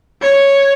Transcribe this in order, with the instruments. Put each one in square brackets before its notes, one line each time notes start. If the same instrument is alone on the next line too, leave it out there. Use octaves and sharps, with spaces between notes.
[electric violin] C#5